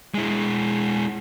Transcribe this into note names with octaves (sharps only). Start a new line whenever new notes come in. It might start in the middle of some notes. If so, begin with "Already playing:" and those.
G#3 E4